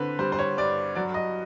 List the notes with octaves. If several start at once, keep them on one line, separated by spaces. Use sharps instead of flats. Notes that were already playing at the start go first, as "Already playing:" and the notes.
Already playing: D3 C4 B4
G3 C5
C5
C#5
G2 D5
F#3 D5
D#5